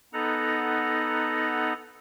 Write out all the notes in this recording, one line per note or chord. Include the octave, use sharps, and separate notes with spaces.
B3 D#4 A4 F#5 A#5